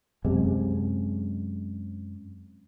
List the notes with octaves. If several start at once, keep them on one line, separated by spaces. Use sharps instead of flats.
F#2 C3 G#3